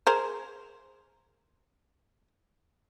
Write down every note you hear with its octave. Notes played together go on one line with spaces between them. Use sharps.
G#4 A#4 C5